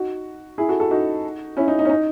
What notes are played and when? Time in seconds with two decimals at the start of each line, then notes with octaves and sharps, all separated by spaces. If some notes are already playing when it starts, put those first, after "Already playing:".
Already playing: D#4 F#4
0.58 E4 G#4
0.68 F#4 A4
0.80 F#4 A4
0.90 D#4 F#4
1.57 C#4 E4
1.68 D#4
1.79 D#4
1.85 C#4
1.89 D#4